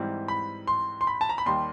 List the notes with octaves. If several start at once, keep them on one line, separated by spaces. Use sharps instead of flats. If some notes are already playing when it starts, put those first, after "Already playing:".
Already playing: G#2 E3 G3 C4
B5
C6
C6
B5
A5
A#5
B5
D#2 D#3 G3 C6